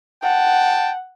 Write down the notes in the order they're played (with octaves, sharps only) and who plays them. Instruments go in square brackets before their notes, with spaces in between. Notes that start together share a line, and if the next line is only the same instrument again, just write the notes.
[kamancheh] F#5 [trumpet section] G5 A5